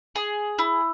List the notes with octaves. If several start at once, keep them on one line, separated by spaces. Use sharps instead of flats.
G#4
E4